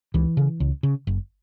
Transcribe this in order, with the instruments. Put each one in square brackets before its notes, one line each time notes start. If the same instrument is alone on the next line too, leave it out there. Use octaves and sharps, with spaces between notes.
[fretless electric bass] C#2 E3
C#3
C#2
C#3
F#1